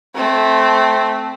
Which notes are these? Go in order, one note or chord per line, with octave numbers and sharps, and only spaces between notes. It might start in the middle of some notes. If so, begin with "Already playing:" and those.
A3 C4